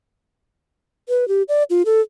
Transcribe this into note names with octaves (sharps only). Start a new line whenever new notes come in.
B4
G4
D5
F4
A4